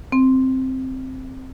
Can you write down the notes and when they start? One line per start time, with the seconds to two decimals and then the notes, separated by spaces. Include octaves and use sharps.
0.12 C4